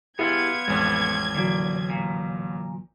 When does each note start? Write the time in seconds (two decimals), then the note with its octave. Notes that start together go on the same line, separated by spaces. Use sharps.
0.19 B3 E4 F4 G4 G#4 G#6
0.68 A1 F2 G#3
1.35 A#2 D3 E3 F#3
1.90 A#2